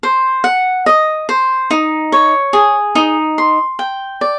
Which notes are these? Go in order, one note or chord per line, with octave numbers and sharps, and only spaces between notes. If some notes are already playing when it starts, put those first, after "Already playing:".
C5
F#5
D#5
C5
D#4
C#5
G#4
D#4
C6
G5
D5